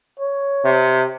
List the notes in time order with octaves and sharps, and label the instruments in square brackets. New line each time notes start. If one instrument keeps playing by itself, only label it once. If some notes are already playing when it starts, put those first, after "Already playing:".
[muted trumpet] C#5
[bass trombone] C3